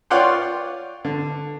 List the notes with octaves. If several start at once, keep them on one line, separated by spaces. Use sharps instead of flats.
F4 C#5 D5 F#5 G5 C6
D3